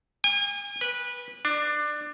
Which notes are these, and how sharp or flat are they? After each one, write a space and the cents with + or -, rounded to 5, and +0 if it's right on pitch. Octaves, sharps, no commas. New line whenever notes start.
G#5 -45
B4 -15
D4 +20